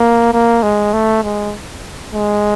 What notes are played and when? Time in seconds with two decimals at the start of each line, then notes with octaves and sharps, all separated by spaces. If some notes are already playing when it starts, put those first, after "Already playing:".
Already playing: A#3
0.33 A#3
0.63 G#3
0.93 A3
1.23 G#3
2.13 G#3